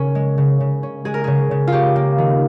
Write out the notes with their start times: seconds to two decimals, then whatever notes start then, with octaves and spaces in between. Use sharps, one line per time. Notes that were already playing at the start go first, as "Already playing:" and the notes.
Already playing: C#3 C#4 A#4
0.15 G#3
0.38 C#3
0.60 C#3
0.83 C#4
1.05 G#3 G#4
1.14 A#4
1.24 C#3 G#4
1.51 C#3
1.67 F4
1.72 C#4 G4
1.96 A#3
2.18 D#3